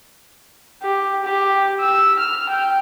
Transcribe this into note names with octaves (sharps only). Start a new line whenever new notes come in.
G4
G4
E6
F6
G5